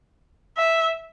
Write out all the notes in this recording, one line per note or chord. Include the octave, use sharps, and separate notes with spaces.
E5